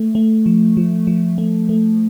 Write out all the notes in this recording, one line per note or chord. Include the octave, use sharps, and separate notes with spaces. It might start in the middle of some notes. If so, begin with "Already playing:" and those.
Already playing: A3
A3
F3
F3
F3
A3
A3